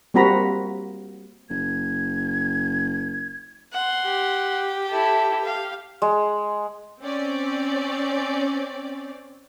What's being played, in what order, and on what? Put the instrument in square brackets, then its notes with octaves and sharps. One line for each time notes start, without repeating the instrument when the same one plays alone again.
[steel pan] G3 A#3 C4 F#4 A#5 B5
[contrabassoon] F#1 [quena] G#6
[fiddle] F#5 C6
[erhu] G4
[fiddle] E4 A4
F5
[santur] G#3
[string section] C4 C#4 D5